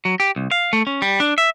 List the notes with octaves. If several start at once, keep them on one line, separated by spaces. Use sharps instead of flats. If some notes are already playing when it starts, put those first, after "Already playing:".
F#3
G4
C2
F5
A3
C#4
G3
D4
E5